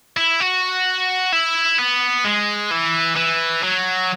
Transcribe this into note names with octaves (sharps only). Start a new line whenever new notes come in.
E4
F#4
E4
B3
G#3
E3
E3
F#3